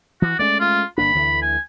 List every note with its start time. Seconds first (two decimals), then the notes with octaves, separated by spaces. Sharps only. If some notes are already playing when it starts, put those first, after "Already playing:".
0.22 E3 F#4
0.39 G#3 A3 C#4 D5
0.60 F4
0.98 G1 A#3 D4 B5
1.15 D2 D3 E3
1.42 G#5